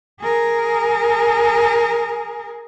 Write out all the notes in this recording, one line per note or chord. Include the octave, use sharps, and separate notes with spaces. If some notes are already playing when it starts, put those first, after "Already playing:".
G#4 A#4